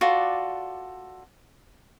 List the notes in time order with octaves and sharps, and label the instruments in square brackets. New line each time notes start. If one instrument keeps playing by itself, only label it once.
[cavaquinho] F4 F#4 A4 D5